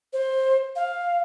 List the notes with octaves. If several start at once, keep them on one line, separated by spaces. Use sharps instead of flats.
C5
F5